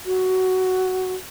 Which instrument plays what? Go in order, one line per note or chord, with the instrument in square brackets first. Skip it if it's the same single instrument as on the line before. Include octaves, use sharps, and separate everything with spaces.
[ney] F#4